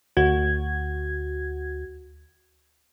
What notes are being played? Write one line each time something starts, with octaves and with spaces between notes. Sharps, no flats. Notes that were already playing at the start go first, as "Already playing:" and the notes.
D2 F#4 G#6